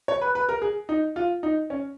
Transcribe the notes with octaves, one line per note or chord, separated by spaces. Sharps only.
C#5
B4
B4
A#4
G#4
D#4
F4
D#4
C#4